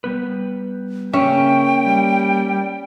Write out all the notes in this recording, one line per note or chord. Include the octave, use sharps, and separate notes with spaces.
G3 B3 B4
C#3 A#3 C#4 A#4 E5 G5
G3